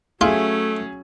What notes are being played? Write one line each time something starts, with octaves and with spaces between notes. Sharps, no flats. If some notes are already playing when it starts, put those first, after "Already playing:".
F#3 A3 C#4 F4 G#4 E5